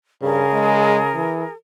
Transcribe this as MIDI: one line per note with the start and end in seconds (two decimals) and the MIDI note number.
0.22 0.44 43
0.22 1.27 49
0.22 1.55 68
0.22 1.55 70
0.53 0.99 56
1.15 1.44 52